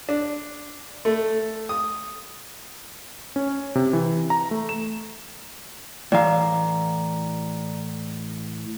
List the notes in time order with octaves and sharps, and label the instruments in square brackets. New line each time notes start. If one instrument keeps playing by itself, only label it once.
[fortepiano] D4
A3
D#6
[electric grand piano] C#4
C3
E3
A#5
A3
E7
[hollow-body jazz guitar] A2 E3 F5 [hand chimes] D5 A#5